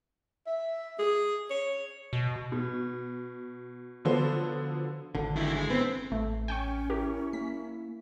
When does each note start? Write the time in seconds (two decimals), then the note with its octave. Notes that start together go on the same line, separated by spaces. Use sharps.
0.46 E5
0.99 G#4
1.51 C#5
2.13 B2
2.52 B2
4.05 D3 F3 F#3 B3 A4 C5
5.15 G#1 D3
5.36 D#3 E4
5.55 G#3 G#4
5.70 B3 C4
6.12 A1 A3
6.48 C#4 G5 G#5 C#6
6.90 E4 G4 A#4
7.33 A#3 B6